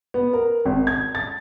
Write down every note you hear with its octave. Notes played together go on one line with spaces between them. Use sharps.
B3
A#4
G#1
G#6
A6